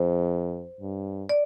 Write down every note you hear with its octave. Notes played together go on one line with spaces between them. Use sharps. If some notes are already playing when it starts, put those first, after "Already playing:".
Already playing: F2 C5
G2
D5